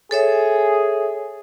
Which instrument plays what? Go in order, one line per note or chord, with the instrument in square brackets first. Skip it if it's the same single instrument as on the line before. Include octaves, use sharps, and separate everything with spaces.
[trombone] G#4 [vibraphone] A4 C#5 E5